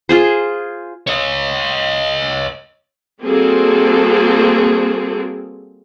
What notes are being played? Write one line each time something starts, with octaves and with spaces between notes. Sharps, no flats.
F4 G#4 C5
C#5 D#5
G3 A#3 C4 F#4 G#4 A4